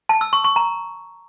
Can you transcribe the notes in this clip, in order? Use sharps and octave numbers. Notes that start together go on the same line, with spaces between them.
A5
E6
C#6
C#6
A#5